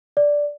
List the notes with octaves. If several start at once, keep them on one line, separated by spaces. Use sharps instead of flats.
D5